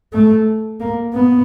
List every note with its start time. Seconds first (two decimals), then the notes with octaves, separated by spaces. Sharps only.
0.13 A3
0.80 A#3
1.13 B3